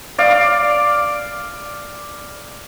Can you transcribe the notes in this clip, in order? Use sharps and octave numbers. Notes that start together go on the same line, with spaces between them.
D5 F5